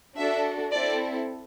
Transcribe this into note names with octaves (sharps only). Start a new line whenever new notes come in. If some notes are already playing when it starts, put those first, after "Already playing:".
D4 F#4 A4 E5
C4 E4 A4 D5